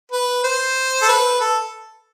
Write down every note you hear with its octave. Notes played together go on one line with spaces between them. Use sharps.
B4
C5
A4
B4
A4